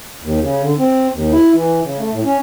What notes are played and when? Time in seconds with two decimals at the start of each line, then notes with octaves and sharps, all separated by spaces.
0.22 D#2
0.43 C#3
0.62 D3
0.79 C4
1.13 D#2
1.32 E4
1.54 E3
1.84 C#3
1.99 A3
2.12 A2
2.25 C#4